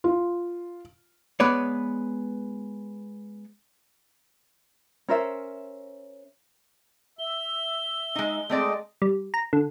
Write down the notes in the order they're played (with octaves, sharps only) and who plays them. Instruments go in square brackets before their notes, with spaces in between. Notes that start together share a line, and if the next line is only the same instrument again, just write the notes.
[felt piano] F4
[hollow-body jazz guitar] G#3 B3 B4 C#5 D5
[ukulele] C#4 A#4 C5 E5
[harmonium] E5 [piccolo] G7
[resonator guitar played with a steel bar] G#3 D#4
[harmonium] G#3 D#5 [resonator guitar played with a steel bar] A3 C4 D5
[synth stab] G3
A#5
D3